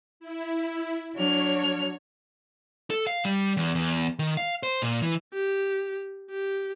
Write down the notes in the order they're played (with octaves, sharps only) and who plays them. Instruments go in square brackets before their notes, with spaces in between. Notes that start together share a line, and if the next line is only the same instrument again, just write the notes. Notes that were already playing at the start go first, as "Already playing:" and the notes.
[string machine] E4
[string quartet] F#3 D4 F6 [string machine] C#5
[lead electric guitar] A4
F5
G3
E2
E2
D#3
F5
C5
A#2
E3
[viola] G4
G4